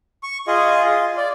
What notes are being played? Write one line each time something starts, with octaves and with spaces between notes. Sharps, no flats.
C#6
F4 G#4 D#5
F4
D5